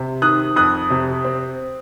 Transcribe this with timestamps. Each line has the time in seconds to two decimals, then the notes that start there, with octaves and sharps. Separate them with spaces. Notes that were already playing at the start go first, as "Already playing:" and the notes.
Already playing: C3
0.22 D#3 D#6 F#6
0.56 F2 D#6 F#6
0.90 C3
1.24 C4